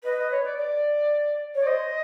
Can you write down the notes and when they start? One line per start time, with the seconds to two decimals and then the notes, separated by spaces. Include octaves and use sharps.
0.04 B4 D#5
0.18 D#5
0.31 C#5
0.45 D5
0.58 D5
1.55 C#5
1.61 D5
1.66 C5 D#5